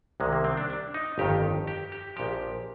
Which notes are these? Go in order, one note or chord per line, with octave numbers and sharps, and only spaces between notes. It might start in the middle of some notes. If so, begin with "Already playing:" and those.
C2 C3 D#3 G#3
A#3
C4
D4
D4
D#4
G1 F2 D#3 G4
G4
G4
A#1 A#2 F3 G4